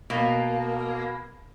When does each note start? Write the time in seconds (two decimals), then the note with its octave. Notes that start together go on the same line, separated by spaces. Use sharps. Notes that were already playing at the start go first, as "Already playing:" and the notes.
0.10 B2 A#3